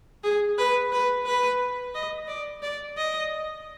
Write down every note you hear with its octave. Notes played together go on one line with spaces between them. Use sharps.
G#4
B4
B4
B4
D#5
D5
D5
D#5